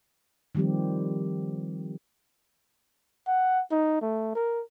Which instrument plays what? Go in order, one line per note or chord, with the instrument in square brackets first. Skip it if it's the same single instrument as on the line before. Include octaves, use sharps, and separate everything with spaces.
[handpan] D#3 F3 G3 C4 G4
[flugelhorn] F#5
D#4
A3
A#4